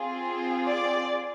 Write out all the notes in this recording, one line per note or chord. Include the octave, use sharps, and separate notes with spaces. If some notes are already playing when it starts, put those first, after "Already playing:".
Already playing: C4 F4 G#4
D5